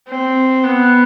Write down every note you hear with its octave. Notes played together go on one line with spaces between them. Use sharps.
C4
B3